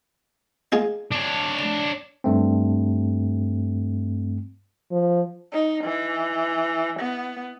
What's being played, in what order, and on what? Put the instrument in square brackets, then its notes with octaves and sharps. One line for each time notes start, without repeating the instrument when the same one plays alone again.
[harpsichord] D#4 F4 G#4
[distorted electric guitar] D4 C#5
[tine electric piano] G2 A3 C4
[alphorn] F3
[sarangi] D#4
E3
B3